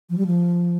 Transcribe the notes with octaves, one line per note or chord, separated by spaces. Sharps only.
F3
G3
F3